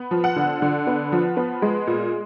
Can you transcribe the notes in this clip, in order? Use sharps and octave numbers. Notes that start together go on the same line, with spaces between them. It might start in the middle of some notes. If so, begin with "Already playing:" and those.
Already playing: B3
F3
F#5
D3
D3
B3
F3
B3
G#3
A#2